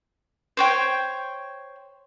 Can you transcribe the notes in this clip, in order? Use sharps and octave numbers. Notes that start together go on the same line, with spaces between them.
C5 C#5 G5